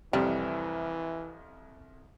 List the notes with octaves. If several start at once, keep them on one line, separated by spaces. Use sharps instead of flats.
C2 F2 E3 G3